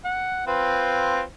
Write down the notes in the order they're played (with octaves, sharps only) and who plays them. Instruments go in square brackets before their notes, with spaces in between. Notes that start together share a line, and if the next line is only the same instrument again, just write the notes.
[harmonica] F#5
C4 F4 B4